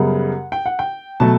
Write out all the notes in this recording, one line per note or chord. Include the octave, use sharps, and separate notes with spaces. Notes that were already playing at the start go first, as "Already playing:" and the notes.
Already playing: F#2 C#3 G3 B3 F#5
G5
F#5
G5
B2 F#3 A3 A5